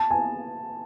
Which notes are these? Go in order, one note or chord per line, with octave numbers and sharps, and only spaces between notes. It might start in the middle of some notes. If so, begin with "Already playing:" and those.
Already playing: A5
G#5